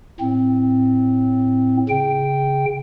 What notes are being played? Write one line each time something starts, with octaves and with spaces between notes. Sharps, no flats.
A2 C4
C#3 G5